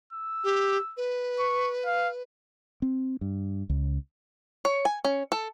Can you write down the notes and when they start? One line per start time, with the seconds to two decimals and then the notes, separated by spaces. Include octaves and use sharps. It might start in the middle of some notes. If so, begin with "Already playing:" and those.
0.13 E6
0.44 G4
0.97 B4
1.39 C#6
1.86 F5
2.82 C4
3.21 G2
3.70 C#2
4.65 C#5
4.85 G#5
5.05 C#4
5.32 A4